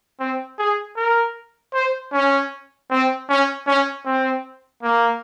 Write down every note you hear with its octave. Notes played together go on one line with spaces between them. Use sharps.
C4
G#4
A#4
C5
C#4
C4
C#4
C#4
C4
A#3